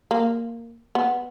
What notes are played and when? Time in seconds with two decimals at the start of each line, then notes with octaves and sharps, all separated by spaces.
0.11 A#3
0.95 B3